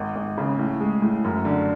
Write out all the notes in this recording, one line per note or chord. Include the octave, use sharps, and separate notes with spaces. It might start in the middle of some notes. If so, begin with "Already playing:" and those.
Already playing: G#1
G#1
C#3
A2
G#3
A2
F#2
D3